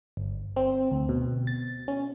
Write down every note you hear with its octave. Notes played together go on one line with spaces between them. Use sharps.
G1
C4
D2
B2
A6
C#4